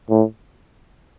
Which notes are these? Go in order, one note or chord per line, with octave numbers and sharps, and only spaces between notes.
A2